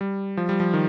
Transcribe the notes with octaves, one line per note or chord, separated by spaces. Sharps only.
G3
F3
G3
F3
D#3